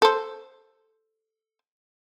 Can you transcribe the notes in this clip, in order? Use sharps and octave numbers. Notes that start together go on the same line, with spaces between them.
A4 C5